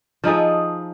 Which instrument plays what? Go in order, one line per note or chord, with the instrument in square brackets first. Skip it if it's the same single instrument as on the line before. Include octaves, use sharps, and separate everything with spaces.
[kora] F3 D#4 G#4 A4